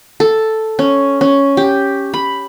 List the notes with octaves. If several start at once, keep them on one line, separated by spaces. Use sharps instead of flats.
A4
C#4
C#4
G4
B5